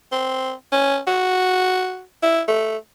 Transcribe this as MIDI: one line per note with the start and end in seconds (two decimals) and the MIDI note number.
0.12 0.52 60
0.72 0.99 61
1.07 2.03 66
2.23 2.41 64
2.48 2.77 57